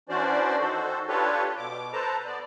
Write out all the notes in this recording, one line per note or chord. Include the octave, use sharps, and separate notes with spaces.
E3 C#4 D4 F#4 C5 D5
D#3 F#4 A4 C5
D4 F4 G4 A4 B4 C#5
B2 D6
A4 B4 C5 A5 A#5
B3 D5